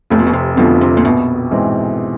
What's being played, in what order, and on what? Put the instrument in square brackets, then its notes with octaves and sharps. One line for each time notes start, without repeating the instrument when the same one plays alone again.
[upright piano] F1 [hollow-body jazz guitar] A2
[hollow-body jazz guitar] A#2
B2
C3
[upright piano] F2 D3 F3 A3 [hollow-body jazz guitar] B2
[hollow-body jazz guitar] C3
A#2
[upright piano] A#1 [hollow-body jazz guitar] B2
[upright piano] G#2 E3 G#3 C4